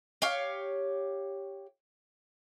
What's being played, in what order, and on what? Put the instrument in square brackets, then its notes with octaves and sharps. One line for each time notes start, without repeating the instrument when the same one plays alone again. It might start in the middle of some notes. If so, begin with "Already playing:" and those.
[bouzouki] G4 C#5 F5